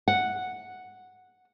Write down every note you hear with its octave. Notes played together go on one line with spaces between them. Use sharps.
F#5